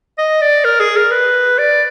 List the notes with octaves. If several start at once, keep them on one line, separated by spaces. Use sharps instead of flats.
D#5
D5
A#4
G#4
A#4
B4
D5